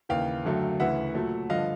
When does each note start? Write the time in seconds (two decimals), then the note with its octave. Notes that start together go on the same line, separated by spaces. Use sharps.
0.09 D#2 C#3 E3 F5 G5
0.45 F#2 D3 F#3 A3
0.80 D2 C#3 E3 E5 F#5
1.14 A#2 F#3 A3
1.50 G2 D3 F3 D#5 F5